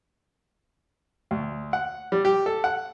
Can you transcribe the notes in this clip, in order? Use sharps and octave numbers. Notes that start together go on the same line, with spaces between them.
D2
F#5
G3
G4
A4
F#5